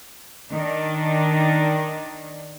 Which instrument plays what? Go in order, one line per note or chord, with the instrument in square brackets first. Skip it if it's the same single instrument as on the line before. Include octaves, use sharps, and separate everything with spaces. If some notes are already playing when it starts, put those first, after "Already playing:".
[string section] D#3 D4